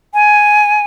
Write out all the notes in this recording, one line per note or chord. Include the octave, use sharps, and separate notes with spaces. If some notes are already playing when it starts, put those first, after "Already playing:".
G#5